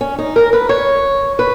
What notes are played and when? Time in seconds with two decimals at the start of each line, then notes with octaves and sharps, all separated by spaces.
0.01 C#4
0.19 D#4
0.36 A#4
0.53 B4
0.69 C#5
1.39 B4